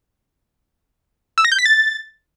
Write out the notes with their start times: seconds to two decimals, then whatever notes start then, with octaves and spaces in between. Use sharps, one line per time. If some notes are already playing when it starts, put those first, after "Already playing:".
1.38 E6
1.45 A#6
1.52 G6
1.59 B6
1.66 A6